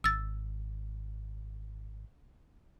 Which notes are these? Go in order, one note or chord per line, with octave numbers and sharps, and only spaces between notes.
G#1 E6 A6